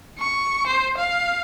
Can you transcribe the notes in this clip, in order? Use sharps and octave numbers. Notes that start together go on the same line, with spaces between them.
C#6
C5
F5